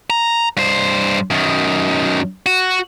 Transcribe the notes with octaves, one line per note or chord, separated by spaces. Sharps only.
A#5
G2 C5
F#2 D#3
F#4